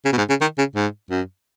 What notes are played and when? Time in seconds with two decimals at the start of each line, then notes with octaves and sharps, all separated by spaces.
0.05 C#3
0.13 B2
0.18 G#2
0.29 C#3
0.41 D#3
0.58 C#3
0.76 G#2
1.10 F#2